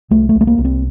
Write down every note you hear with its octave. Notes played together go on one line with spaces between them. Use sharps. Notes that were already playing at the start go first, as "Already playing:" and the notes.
C2 A3
A3
C2
A3
A#3
C2
C4